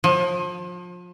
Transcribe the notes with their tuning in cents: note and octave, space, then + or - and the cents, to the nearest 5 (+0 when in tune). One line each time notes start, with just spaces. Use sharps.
F3 +30